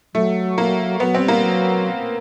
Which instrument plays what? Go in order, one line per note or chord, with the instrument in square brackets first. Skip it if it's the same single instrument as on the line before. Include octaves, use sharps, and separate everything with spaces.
[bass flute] F#3 [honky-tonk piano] A3
[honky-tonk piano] A#3
[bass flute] F#3 [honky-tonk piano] B3
[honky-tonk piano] C4
[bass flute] G3
[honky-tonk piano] A#3
[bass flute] F#3